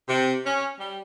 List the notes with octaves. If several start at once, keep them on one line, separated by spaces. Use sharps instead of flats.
C3
C#4
G3